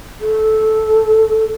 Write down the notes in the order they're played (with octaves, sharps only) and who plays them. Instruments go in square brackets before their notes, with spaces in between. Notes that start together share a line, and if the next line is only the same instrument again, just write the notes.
[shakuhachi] A4